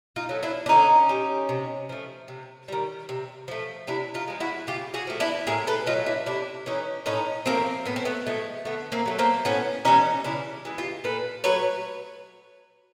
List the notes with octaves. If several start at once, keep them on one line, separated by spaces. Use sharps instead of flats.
D#4 F4
F#3 A3
D4 E4
D4
D3 C#4 D#4
G3
C3
F3 A3
C3
D#3 G3
C3
F3 A3
C3 D4 E4
D#4 F4
F3 G#3
E4 F#4
C#3 F4 G4
F#4 G#4
F3 A3
D4 E4
A2 G#4 A#4
A4 B4
F#3 A3 D#4 F4
D4 E4
C3 D4 E4
E3 A3 C#4 D#4
A2 C#4 D#4
F3 A3 A#3 C4
A2 B3
C4
A3 B3
F3 G#3 A3
D3 A3 B3
A#3 C4
F#3 A3
A#3 C4
A2 B3 C#4
E3 G3 C#4 D#4
C#3 D4 E4
E3 G#3
F4 G4
A#2 A4 B4
F#3 A3 B4 C#5